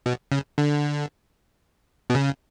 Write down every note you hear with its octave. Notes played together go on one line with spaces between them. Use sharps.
B2
C#3
D3
B2
C#3